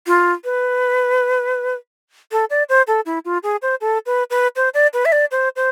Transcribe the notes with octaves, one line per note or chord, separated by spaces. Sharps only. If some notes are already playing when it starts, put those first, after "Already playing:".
F4
B4
A4
D5
C5
A4
E4
F4
G#4
C5
A4
B4
B4
C5
D5
B4
E5
D5
C5
C5